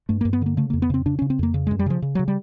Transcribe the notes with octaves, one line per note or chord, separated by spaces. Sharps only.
G2 A3
A#3
G2
B3
D3 A#3
C#3 A3
F2 A#3
B3
C#3 C4
C#3 D4
C#3 C#4
C4
F2 A#3
C#3
G#3
F#2
G3
C#3 F3
C#3
F#3
C#3
G3